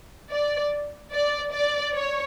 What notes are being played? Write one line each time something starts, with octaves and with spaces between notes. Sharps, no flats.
D5
D5
D5
C#5